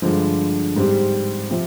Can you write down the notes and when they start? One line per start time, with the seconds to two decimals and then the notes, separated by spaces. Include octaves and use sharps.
0.02 G2 D3 F3 G#3
0.76 G#2 G3 C4 G4
1.51 C3 F3